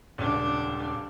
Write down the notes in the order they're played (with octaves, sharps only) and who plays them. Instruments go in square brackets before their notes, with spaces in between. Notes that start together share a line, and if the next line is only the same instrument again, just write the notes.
[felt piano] D#1 C#2 [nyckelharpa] D4